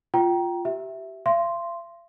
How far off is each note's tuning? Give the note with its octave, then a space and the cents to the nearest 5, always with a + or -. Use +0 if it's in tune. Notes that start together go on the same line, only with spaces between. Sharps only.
F4 +0 G5 -20 A#5 +20
G4 -25 E5 +0
F5 -45 C6 +0